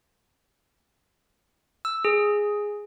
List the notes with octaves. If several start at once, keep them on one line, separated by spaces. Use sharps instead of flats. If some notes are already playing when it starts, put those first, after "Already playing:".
E6
G#4